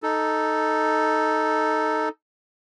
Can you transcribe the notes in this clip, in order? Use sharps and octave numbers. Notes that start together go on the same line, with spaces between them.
D#4 A4